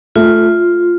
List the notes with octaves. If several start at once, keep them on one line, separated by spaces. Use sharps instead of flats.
A3 F4